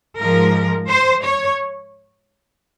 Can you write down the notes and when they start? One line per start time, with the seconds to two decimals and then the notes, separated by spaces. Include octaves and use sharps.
0.18 G#2 F3 G#3 A#4
0.88 C5
1.23 C#5